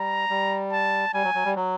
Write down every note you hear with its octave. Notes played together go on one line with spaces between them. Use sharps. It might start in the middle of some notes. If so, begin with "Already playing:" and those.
Already playing: G3 A#5
G3
A5
G3 G#5
F#3
F#3
G3
F#3